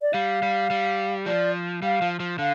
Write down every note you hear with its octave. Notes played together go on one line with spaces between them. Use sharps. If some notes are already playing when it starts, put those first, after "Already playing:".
D5
G3 F5
G3
G3
F3 D5
G3 F5
F3
F3
D3 F5